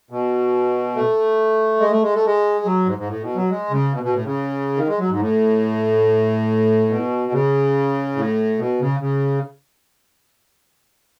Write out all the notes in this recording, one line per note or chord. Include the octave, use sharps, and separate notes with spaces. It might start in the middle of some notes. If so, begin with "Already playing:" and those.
B2
A3
G#3
A3
G#3
A3
G#3
F#3
G#2
G#2
A2
B2
F#3
G#3
C#3
B2
B2
A2
C#3
D#3
G#3
F#3
G#2
A2
B2
C#3
A2
B2
C#3
C#3